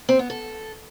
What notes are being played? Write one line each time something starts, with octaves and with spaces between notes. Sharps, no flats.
C4
B3
A4